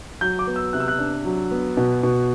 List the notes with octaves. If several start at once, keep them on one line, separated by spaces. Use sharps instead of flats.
F#3 G6
D6
B3
E6
C3 F#6
E6
F#6
D4
F#3
B3
B2
B2